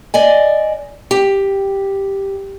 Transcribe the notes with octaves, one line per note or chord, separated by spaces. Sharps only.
D5 D#5 G#5
G4